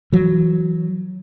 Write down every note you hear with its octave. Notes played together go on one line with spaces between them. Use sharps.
E3 F#3